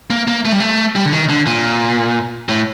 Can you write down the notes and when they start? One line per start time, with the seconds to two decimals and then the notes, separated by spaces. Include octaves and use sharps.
0.10 A#3
0.28 A#3
0.45 A3
0.52 G3
0.60 A3
0.96 G3
1.05 D3
1.12 D#3
1.29 D3
1.47 A#2
2.49 A2